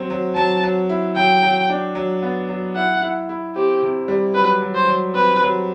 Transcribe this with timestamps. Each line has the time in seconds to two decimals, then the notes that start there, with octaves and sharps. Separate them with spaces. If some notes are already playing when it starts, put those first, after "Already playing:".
Already playing: F#3 C4
0.10 F#3
0.36 F#3 A5
0.63 F#3
0.89 E4
1.16 F#3 G5
1.43 F#3
1.70 D4
1.95 F#3
2.23 B3
2.49 F#3
2.76 E4 F#5
3.02 E4
3.29 E4
3.56 C4 G4
3.82 C3
4.08 G3
4.35 F#3 B4
4.62 F#3
4.75 C5
4.88 F#3
5.15 C4 B4
5.42 F#3